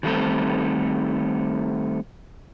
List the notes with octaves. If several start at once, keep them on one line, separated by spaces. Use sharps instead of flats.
D#3 F#3 G3 A3 C4 A4